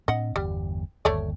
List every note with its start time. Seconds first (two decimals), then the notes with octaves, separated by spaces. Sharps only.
0.08 A2 C4 D4 D#5 F#5
0.36 G1 E2 G3
1.05 G1 D#2 A3 C#5 D5